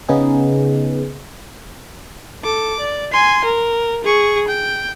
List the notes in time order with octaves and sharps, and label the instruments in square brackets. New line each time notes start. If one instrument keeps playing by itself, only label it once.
[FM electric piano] C#3 B3 D#4 G#4
[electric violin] A4 D6
D5
G#5 C6
A#4
G#4 C#6
G5